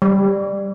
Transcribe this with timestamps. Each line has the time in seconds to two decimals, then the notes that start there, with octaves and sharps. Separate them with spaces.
0.02 G3